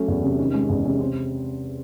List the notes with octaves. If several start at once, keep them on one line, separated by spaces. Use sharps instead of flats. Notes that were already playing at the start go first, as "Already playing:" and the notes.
Already playing: F#3 A3 C#4
E2
C3 C#4
D#3 C#4
G#3 C#4
E2 C#4
C3 C#4
C4 C#4